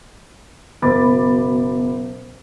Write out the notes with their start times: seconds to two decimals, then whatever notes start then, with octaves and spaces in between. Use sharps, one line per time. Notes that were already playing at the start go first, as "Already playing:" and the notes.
0.82 F#1 B2 B5 D6 A6